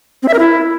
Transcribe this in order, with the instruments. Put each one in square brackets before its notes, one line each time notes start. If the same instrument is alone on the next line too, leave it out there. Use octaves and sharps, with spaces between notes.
[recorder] C4
E5
A#4
E4